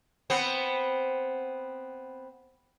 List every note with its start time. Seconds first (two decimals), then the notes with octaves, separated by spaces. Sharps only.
0.30 B3 C4